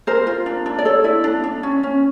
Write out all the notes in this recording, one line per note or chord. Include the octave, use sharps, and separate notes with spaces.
A#4 C5
F4
D4
D4
D5
A4 C#5
E4 D5
D4
D4
C#4
C#4